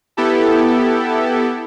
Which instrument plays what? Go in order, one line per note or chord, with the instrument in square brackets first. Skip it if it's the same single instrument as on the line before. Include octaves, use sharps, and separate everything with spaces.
[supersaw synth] B3 E4 G4 A4